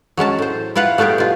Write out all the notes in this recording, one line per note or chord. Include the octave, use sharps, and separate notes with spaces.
F#3 G#3 C#4 A5
A2 C5
E4 F4 B4 F5 F#5
G3 A3 B3 G4 G#4
B2 F4